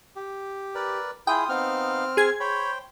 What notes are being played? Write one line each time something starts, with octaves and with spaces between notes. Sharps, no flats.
G4
A#4 B4 D5
E4 F4 G#4 G5 D#6
B3 C4 D#4 F5 F6
G#4 G#6
C5 C#5 G5 B5